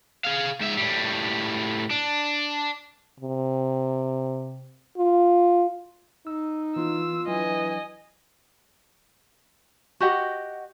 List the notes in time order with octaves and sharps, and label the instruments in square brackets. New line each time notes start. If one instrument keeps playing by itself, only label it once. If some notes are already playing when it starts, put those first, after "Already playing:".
[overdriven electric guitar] G#4 F5
G#2 E5
A2 G3
D4
[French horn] C3
F4
[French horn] D#4 [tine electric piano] E6
[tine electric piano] E3 B3 [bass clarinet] F4 [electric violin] E6
[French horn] E3 [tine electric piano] F#3 D4 [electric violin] D#5 G#5
[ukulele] F#4 G4 D#5 F#5